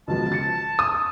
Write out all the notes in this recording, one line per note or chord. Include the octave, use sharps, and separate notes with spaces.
C#2 B2 F3 A5
A6 C#7
D#6 E6